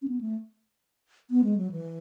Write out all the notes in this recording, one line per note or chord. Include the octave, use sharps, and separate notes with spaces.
C#4
B3
A3
B3
G#3
F#3
E3